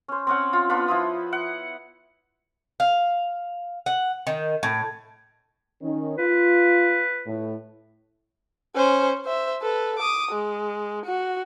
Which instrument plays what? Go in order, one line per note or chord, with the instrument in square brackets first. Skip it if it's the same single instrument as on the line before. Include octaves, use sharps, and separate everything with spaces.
[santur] C#4 C5
C4 C#4 F#5
F4
B3 D4 F4 B4
F3 E4 D#6
F#5
[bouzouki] F5
F#5
D#3
A2
[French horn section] D#3 C#4 D#4
[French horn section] F4 [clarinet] B4
[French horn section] A2
[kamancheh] C#4 C5
C5 E5
A4 B4
D6 D#6
G#3
F#4